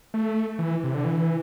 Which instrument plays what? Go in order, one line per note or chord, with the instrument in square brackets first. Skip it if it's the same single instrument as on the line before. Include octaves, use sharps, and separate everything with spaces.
[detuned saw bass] A3
E3
C3
D3
E3